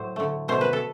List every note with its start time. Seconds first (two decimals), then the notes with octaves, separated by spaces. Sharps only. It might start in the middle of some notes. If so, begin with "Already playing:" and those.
Already playing: A2 F#3 C5
0.16 D3 A3
0.48 B2 A3 C5
0.61 B4
0.73 A4